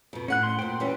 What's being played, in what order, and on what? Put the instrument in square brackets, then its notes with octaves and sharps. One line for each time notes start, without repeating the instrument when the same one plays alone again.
[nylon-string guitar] F2 B2
[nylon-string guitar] A2 F#5 [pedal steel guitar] C#4 F#6
[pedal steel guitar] C6
[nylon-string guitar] A#2 C5 [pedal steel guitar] G5 C6
[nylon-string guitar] E3 G3 C#4